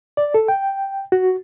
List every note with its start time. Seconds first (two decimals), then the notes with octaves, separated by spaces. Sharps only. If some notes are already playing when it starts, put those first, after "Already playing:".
0.17 D5
0.34 A4
0.48 G5
1.12 F#4